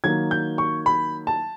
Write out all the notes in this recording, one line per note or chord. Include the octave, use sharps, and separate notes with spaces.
D#3 F#3 A#3 G#6
G6
C#6
B5
A5